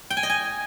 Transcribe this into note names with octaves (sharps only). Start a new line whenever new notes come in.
G5
G#5
D#5
G#5